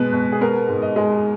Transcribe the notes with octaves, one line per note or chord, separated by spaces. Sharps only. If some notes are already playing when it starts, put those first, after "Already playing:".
Already playing: B2 G#3 B4
B2
G#4
B3 A#4
G#2
D#5
G#3